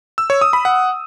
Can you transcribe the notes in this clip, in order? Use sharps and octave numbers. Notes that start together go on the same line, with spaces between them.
E6
C#5
D#6
B5
F#5